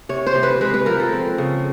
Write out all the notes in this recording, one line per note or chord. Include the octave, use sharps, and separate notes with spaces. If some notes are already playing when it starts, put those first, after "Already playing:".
C3 C#5
C5
C3
B4
G#3 B4
B4
F3 A#4
A4
C4
C#3